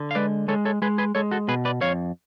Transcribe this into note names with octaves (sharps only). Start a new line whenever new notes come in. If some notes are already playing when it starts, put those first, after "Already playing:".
Already playing: D3
F5
G#3 B4 D5
G#3 A4 C#5
A4 C#5
G#3 G#4 B4
G#4 B4
G#3 A4 C#5
F#4 A4
B2 G#4 B4
B4 D5
F2 C#5 F5